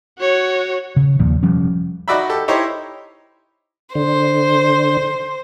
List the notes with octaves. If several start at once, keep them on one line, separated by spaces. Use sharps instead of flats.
F#4 C#5
C#3
D#2 A#2 F3
F1 F3 G3 C#4
D#4 F#4 D5 E5 B5
G4 A4
D#4 E4 G4 C5 C#5
D3 C5